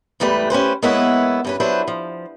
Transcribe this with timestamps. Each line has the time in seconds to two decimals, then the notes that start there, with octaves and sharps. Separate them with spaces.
0.20 E2 G#2 G3 A3 B4
0.50 C#4 G4 B4 C5
0.83 G#3 A#3 B3 E4 B4 C#5
1.45 G2 C#4 B4
1.60 F#3 D4 E4 B4 C5
1.88 F3